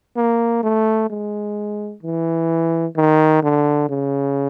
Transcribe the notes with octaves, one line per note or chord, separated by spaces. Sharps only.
A#3
A3
G#3
E3
D#3
D3
C#3